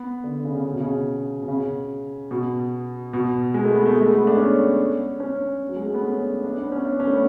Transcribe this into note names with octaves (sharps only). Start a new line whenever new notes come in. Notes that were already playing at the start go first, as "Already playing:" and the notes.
Already playing: B3
D3
C#3
C#3
C#3
B2
C#3
B2
C#3
B2
B2
G#3
A3
B3
A3
G#3
A3
B3
D4
C#4
C#4
F#3
G#3
A3
B3
C#4
D4
D4
C#4
B3
C#4
D4
C#4
A3
B3